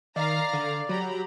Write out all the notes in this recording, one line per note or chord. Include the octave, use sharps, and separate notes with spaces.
D#3 D5 F5 A#5
D3
F#3 G4 A#5 B5